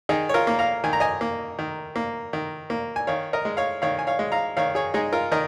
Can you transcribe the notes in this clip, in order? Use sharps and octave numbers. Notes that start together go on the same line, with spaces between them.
D#3 D#4 G#4
C#5
F4 A#4
A#3
F5 A#5
D#3 G#5
A#5
D#5 G#5
A#3
D#3
A#3
D#3
A#3
G#5
D#3 C#5 F5
A#4 D#5
G#3
C#5 F5
D#3 C#5 F5
G#5
C#5 F5
G#3
F5 A#5
D#3 C#5 F5
G#4 C#5
G#3 D#4 G#4
F4 A#4
D#3 A#4 D#5